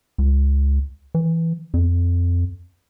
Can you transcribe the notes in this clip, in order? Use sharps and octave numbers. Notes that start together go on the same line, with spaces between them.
C#2
E3
F2